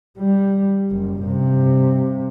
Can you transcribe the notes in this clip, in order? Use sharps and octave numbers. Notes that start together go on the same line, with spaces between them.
G3
F#1
G2 C3